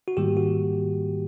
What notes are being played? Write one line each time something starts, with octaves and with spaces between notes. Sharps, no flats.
F#4
G#2 D#3 G3 A#3 G4
F#4